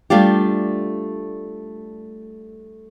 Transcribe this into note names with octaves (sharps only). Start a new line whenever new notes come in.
G3 A3 D4 F4 G4